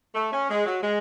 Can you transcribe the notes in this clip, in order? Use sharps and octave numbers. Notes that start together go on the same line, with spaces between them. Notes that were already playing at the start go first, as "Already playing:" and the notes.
A3
C#4
G#3
F#3
G#3